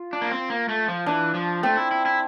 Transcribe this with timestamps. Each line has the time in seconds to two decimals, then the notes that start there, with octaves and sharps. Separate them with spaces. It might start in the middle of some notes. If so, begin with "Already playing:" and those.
Already playing: F4
0.13 D4
0.22 A#3
0.31 C4
0.50 A#3
0.69 A3
0.88 F3
1.06 E3 D4
1.34 F3
1.63 A3 C4
1.77 E4
1.91 E4
2.06 E4